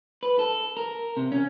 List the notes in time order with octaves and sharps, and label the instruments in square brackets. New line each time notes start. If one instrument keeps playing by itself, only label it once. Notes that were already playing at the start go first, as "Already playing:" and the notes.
[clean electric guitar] B4
A4
A#4
C3
C#4